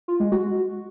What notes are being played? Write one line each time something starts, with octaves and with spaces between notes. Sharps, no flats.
F4
G#3
F#4